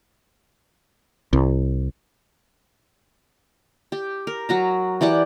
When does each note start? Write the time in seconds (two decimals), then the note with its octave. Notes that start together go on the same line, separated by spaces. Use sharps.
1.33 C2
3.92 G4
4.27 A#4
4.49 F#3 F#4 A#5
5.01 E3 G4 D5 F#5